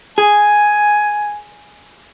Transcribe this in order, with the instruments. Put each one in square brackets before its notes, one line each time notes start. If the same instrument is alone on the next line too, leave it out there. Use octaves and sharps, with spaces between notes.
[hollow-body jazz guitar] G#4 [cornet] G#5